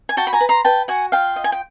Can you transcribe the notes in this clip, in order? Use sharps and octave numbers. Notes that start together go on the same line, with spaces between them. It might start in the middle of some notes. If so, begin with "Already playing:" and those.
G#5
F#4 G5 A5
B5
G#5 A#5
B4
A#5 C6
B4 G5 A5
F#4 F#5 G#5
F4 F5 G5
D#5
G#5
G5